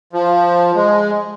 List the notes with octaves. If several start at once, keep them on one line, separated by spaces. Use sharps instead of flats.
F3
G#3